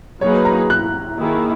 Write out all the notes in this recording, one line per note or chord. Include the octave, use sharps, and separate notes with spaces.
F#3 A#3 D#4 G#4 B4 C#5
A#5
F#6
D#3 A#3 E4 G#4